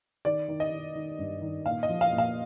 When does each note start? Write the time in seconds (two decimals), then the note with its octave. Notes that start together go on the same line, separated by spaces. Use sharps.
0.25 D#3 D5
0.48 D#3
0.60 D#5
0.72 D#3
0.95 D#3
1.19 G2
1.42 D#3
1.66 A#2 F5
1.83 D#5
1.89 F3
2.01 F5
2.12 A#2
2.18 F5